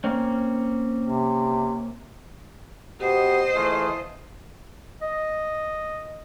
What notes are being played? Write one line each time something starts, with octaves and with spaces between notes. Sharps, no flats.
A#3 C4 C#4
C3
B2 B3 G4 C5 D#5
E3 A3 F4 G#4
D#5